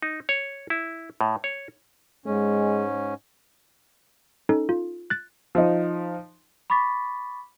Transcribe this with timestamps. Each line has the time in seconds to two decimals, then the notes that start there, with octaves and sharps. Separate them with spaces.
0.02 D#4
0.29 C#5
0.70 E4
1.21 A2
1.44 C#5
2.26 G#2 G#3 C#4
4.49 C#4 D#4 A4
4.69 F4
5.10 F#6 A6
5.55 F3 D#4
6.70 B5 C#6 D6 A6 B6